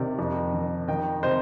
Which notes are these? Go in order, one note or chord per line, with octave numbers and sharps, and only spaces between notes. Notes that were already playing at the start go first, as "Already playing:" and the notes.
Already playing: C3 D#3 D5
F2
D#3
D#3 D#5 G5
C3 C5 D#5